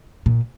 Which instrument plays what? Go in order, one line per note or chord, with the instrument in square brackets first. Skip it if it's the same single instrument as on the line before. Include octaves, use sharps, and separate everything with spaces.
[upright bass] A#2